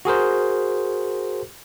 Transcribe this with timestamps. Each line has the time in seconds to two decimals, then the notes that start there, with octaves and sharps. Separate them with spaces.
0.05 F#4 G#4 A#4 C5